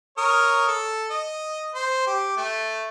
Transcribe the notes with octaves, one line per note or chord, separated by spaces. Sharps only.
A#4 C#5 D#6
A4
D#5
C5
G4
A3